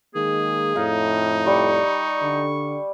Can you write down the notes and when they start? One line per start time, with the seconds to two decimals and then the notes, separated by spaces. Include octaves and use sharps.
0.15 D#3 G#3 A#3 G#4
0.76 F2 A2 D#4 F5
1.46 G3 C#6
2.22 D3